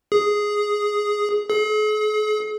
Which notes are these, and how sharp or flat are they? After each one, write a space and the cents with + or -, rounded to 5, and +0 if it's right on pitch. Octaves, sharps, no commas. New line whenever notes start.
G#4 +0
G#4 +45